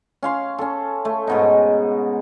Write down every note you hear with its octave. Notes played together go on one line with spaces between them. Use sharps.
C#4 F5 C6
C#4 A4
A3
G#2 B2 D#4